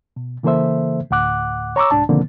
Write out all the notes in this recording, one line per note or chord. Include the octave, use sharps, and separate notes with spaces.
B2
C#3 E3 A#3 A4 C5 E5
D2 A2 F#5 D6 F#6
C#5 A#5 C#6 D6 E6
C2 G#2 D4 A5
B2 D3 D#3 F3 A#3 C4